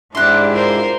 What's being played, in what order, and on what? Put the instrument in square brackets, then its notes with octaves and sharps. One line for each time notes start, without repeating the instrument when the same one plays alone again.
[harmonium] G#2 E4 [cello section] D4 G4 [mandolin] C6 F#6
[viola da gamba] F4 A#4 C5